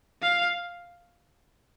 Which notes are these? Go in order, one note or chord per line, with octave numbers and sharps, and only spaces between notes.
F5